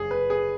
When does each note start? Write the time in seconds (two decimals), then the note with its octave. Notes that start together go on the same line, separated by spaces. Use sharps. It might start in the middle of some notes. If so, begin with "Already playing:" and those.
Already playing: F#1 F#2 F#3 G#4
0.11 B4
0.30 G#4